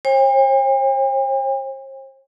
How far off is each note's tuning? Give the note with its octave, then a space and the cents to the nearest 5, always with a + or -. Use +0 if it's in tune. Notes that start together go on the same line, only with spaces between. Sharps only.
C5 +45 G5 +45